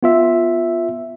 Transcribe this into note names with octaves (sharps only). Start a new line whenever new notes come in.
B3 F4 E5